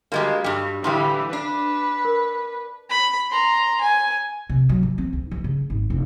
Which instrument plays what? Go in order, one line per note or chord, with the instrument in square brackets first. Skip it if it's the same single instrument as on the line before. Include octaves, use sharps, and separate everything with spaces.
[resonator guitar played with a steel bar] G3 G#3 A#3 [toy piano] D4 F#4 D#5
[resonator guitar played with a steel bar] G2 G3
[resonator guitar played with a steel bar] A2 D3 G3 [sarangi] E3 [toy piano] F5 C6 D#6
[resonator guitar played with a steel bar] D4 [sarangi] B4
[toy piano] A#4
[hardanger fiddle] B5
A#5 C6
G#5
[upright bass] C3
F#3
E3
C4
D2
E3
C#3
G#1
F1